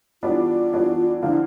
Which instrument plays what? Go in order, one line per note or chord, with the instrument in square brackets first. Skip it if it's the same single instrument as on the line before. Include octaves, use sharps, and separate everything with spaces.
[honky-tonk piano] E3 G3 B3 D4 F#4 [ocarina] F4
[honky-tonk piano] E3 G3 B3 D4 F#4
[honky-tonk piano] D3 F3 A#3 [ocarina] E4